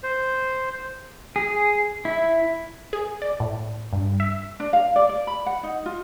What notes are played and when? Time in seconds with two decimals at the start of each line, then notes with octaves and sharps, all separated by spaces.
0.03 C5
1.36 G#4
2.05 E4
2.93 G#4
3.22 D5
3.40 A2
3.93 G2
4.20 E5
4.60 D4
4.73 F5
4.96 D5
5.09 D5
5.27 B5
5.46 F#5
5.63 D#4
5.86 F4